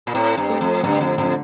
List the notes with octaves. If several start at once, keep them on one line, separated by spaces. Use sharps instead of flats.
A#2
A2 C4
G2
A3
F2
G2 D3
F2
F2 D3